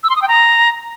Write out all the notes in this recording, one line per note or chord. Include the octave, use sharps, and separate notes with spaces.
E6
C6
D#6
G5
A#5